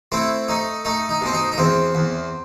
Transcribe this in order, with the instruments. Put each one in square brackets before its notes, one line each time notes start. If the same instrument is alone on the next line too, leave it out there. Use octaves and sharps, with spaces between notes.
[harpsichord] A3 C4 E4
A3 D#4
A3 D#4
D#4
B2 C4
D#4
D#4
E2 C4
E2